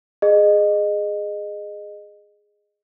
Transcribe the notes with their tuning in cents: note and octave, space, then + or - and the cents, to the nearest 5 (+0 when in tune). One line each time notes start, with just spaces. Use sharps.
G#4 +0 D#5 -20